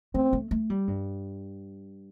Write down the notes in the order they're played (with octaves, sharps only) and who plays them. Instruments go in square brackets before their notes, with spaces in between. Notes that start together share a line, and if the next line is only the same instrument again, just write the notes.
[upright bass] A3 [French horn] C4
[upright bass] A3
A3
G3
G2